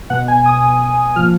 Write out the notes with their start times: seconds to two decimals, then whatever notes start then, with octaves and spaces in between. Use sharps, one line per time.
0.10 B2 F#5
0.28 G#5
0.46 D#6
1.16 F3 F6
1.19 A#2